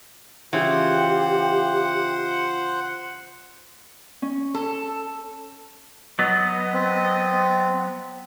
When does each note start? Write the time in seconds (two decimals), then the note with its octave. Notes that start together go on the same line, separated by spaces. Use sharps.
0.53 C#3 E3 F4 G4 C5 F#5
4.22 C#4
4.54 A4
6.19 F#3 B3 D#5
6.73 C4